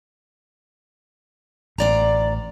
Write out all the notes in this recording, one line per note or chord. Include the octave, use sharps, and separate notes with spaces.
A1 D2 D5 A#5